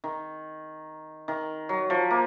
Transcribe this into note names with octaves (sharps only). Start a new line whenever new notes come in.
D#3
D#3
F#3
F3
A#3